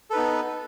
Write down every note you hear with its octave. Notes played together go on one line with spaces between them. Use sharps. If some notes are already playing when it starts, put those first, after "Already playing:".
B3 D#4 A4 B4